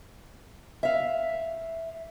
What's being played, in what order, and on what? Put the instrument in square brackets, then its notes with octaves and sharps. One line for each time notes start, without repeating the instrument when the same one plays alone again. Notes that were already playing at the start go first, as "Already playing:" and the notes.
[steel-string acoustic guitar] E5 F5